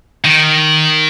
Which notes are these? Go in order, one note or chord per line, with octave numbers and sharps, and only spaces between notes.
D#3